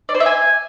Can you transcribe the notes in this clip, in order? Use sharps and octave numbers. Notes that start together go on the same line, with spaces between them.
D5
C5
E5
G#5